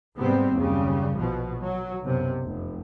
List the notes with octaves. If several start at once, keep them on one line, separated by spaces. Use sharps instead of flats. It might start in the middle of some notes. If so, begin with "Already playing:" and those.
G#2 C3 G3 B3 C4
F#1 D#2 C#3 G3
A#1 B2 F3
F#3
B1 F#2 C3
F1